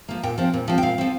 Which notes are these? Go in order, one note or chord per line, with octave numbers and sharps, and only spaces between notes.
F3 A#3
A#2 G5
F3 C4
A#2
F3 C4
G5
A#2 F5
F3 C4